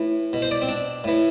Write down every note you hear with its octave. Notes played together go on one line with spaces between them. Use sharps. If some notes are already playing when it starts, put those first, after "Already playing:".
Already playing: A2 E3
B2
C5
D5
C4
D4
A2 E3